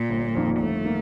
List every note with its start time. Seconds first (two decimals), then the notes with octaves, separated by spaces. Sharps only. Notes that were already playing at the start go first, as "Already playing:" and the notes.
Already playing: A#2
0.10 G1
0.35 F2 D#3 A#3
0.60 G1 A3
0.85 D#3 A#3